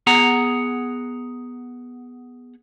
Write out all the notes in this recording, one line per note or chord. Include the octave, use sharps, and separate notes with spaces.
B3 G#4 F#5 A#5